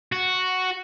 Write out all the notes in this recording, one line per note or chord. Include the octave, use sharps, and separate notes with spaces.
F#4